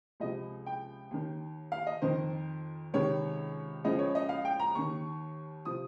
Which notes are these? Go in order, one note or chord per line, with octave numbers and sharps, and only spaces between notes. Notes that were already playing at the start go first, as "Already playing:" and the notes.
C#2 C3 F3 D#5
G5
D#2 D#3
F5
D#5
F2 D#3 C5
C#2 C3 D#3 C#5
C#2 C#3 F3 D#5
C#5
D#5
F5
G5
A#5
D#2 D#3 C#6
C3 F3 D#6